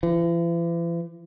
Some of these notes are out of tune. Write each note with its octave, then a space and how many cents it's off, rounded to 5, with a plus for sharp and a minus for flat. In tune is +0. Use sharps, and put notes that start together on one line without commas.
E3 +45